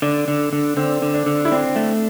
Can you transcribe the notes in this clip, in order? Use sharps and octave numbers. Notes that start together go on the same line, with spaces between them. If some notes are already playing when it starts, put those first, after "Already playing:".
D3 D4
D3
D3
D3 C4
D3
D4
D3
E4
C4 D4
A3